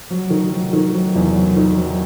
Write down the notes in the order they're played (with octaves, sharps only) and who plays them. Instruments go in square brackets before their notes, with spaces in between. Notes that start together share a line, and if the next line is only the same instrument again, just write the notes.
[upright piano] F#3
D#3
F#3
D#3
F#3
E2
F#3
D#3
F#3